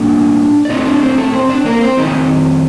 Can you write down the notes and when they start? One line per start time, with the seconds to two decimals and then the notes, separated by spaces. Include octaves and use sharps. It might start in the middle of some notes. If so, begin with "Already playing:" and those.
Already playing: A2 G3 A#3 D4 D5
0.65 D5
0.69 A2 A3 C4 D#4 D#5
0.85 D4 D5
1.01 C4 C5
1.18 A3 A4
1.33 C4 C5
1.50 D4 D5
1.65 A#3 A#4
1.81 C4 C5
1.97 F2 D#3 A3 C4 D#4 D#5